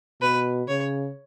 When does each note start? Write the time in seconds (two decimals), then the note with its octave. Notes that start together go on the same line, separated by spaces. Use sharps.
0.21 B2 B4
0.68 C#3 C#5